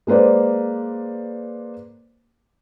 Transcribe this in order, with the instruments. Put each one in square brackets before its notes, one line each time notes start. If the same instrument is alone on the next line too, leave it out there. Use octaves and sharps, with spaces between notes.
[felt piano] G#3 A#3 B4 C5 D5